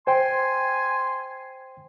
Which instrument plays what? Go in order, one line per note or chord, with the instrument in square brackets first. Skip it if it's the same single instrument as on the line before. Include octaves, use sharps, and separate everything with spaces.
[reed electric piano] C5 G5 [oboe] G#5 [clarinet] C6